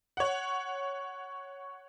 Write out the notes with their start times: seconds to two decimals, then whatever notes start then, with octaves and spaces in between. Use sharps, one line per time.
0.17 C#5 F#5